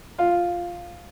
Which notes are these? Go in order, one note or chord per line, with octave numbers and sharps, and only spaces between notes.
F4